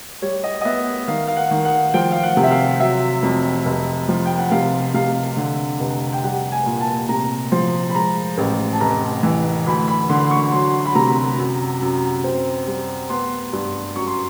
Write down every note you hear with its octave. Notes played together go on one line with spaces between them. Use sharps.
G3 C#5
D#5
D#5
B3 E5
D#3 F5
F5
F#5
D#3
F#5
F3 G5
F5
F#5
C3
E5
F5
F#3 E5
F2
F1
F3
G5
F#5
C3 F5
C3 F5
D3
F1
G5
G3 F#5
G#5
A#2
A5
C3 A#5
F3 C6
B5
G#3 A#5
A1
A5
F1 A#5
E3
D2 B5
B5
D3 C6
C#6
F#3 C6
B5
C3 A#5
F#2
F#2
C4
G3
B3 C6
G2
F#2 C#6
C6